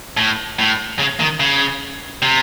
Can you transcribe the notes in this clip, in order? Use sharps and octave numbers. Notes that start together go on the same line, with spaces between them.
A2
A2
C#3
D#3
C#3
C3